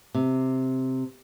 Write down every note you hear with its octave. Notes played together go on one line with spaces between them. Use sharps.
C3